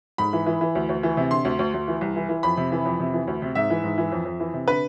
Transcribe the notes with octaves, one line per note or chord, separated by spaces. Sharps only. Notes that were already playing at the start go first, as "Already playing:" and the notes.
G#2 B5
E3
E3
E3
D2
D2
E3
C3
D3 C6
D2
D2
D2
E3
C2
E3
E3
F2 B5
C3
E3
F2
C3
E3
D2
C3
G#2 E5
E3
G#2
E3
F2
F2
E3
C3
D3 B4